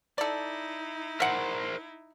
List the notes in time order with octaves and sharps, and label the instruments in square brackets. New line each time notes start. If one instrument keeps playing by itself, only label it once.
[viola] D#4 E4 [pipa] A4 D5
[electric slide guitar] A#4 C5 [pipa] E5 F#5